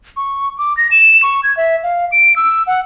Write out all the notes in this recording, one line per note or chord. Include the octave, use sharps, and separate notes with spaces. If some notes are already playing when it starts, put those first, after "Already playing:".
C#6
D6
A#6
E7
C#6
G#6
E5
F5
D7
E6
F#5